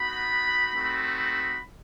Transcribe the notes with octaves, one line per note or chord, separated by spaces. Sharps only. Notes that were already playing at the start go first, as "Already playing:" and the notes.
Already playing: B3 D#4 F#4 B5
A3 C4 D#4 F#4
B5